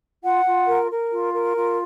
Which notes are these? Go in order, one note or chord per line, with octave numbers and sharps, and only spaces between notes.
F4 F#5
F4
A#4
A#4
F4
A#4
F4